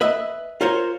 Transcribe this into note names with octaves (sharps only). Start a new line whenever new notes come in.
B4 D#5 E5
F4 A#4 C5 C#5